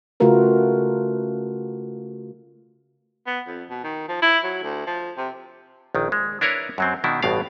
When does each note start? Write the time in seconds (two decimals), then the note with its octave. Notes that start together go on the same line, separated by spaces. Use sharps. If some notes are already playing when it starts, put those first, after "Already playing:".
0.20 C#3 A3 F4 F#4 A#4 B4
3.27 B3
3.47 F2
3.70 B2
3.84 D#3
4.08 F3
4.22 E4
4.44 F#3
4.63 D2
4.87 F3
5.17 C3
5.95 A#1 D#3
6.12 G#3
6.41 D4 E4 A#4 B4 C#5
6.78 F#2 F#3 C4
7.04 B2 D#3 D4 E4
7.23 A1 G2 B2 D5 F5